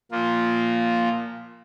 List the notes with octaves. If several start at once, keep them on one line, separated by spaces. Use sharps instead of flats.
A#2 F3 A#3 F4